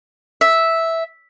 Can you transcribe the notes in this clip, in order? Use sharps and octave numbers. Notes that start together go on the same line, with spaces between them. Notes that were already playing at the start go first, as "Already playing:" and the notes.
E5